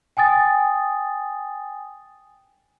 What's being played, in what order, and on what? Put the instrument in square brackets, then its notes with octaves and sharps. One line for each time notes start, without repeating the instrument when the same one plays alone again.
[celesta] G5 G#5 D#6 A6